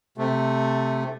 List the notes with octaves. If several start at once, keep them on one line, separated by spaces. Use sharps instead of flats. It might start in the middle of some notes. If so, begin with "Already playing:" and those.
C3 A3